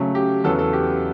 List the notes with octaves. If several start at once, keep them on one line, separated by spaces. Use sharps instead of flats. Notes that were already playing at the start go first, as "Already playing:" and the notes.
Already playing: C#3 F#3 A3
G4
E2 C#3 F#3 B3 A4
A4
G4